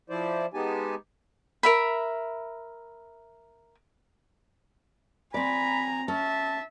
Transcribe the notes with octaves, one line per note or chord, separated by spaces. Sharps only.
F3 E4 C5 D5
G#3 B3 D#4 G4 G#5 A5
A#4 E5 B5
C4 D5 G#5 A#5 B5
C#4 E5 A5